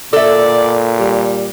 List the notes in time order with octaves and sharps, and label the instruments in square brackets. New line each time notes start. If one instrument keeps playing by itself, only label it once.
[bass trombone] A#2 [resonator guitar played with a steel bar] A4 E5 [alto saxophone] D5
[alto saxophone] G3